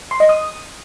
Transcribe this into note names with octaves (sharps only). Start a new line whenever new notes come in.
C6
D#5
D#6